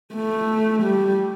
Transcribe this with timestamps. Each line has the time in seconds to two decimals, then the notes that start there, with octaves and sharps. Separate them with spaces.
0.15 A3
0.83 G3